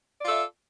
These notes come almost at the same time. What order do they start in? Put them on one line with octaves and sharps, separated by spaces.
D5 F4 A4 E5